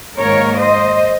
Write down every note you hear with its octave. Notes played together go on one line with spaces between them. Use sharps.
G#2 D#3 A#3 A#4 C#5
C5 D#5